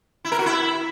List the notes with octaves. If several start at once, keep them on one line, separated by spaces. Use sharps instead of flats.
E4
A#4
F#4
E4